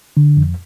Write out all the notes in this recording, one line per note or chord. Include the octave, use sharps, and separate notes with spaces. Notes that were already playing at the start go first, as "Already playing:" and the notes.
D3
F2